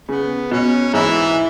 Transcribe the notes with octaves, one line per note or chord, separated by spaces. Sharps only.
C#3 B3
B2 C#4
G#2 E3 E4